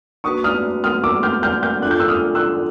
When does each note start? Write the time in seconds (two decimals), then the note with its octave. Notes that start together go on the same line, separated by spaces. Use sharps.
0.24 A#3 D4 F#4 B4 C#6 D#6
0.44 D#6 F6
0.84 D#6 F6
1.04 D6 E6
1.23 F6 G6
1.43 F6 G6
1.63 F6 G6
1.82 D4 F4 A4 F#6
1.91 G6
1.99 E6 F#6
2.08 D#6 F6
2.35 E6 F#6